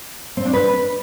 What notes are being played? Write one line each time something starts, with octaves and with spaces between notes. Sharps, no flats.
C4
D4
B4